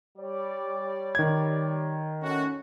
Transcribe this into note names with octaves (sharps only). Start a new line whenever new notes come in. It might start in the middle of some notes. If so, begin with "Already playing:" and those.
G3 C#5 D5
D#3 G#6
A3 C#4 F#4